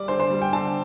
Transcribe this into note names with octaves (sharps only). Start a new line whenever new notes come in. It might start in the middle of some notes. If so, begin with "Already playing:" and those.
Already playing: G3 D5
D3 C5
C5
G3
G5
D3 A5